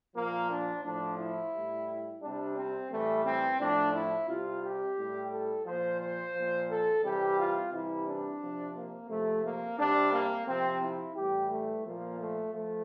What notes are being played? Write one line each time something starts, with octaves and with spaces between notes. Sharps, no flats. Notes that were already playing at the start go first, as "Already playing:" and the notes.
A#2 F3 A#3
D4
A2 F3 D4
E4
A2 G3
C3 G3 D4
C4
A2 E3 G3 A3
C4
A2 F3 D4
E4
C3 G3 F4
G4
A2 G3
A4
A#2 F3 C5
C5
A#2 F3
A4
C3 E3 G3 G4
F4
C3 E3 G3 E4
D4
C3 F3
A#3
C3 F3 A3
A#3
C3 G3 D4
A#3
C3 F3 C4
E4
A2 E3 G3 G4
A3
A#2 F3 A#3
A3
F3 A3